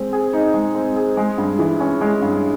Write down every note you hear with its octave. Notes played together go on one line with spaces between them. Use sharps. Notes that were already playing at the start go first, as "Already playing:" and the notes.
Already playing: G#3 C4
G#4
D#4
G#3
C4
G#4
G#3
G2
E3
C#4
G#3
G2